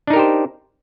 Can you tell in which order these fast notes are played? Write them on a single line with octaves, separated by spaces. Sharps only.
D4 D#4 A#4 G4 C5